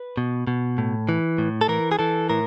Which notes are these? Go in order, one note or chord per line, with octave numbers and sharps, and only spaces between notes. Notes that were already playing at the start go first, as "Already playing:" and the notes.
Already playing: B4
B2
B2
A2
E3
A2
A4
E3 A#4
G#4
E3 A4
A2 A#4